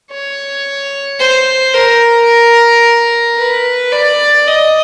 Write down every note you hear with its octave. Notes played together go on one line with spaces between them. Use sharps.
C#5
C5
A#4
B4
D5
D#5